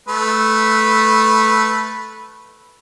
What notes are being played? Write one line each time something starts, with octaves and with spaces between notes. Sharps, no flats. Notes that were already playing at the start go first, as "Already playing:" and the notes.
A3 B4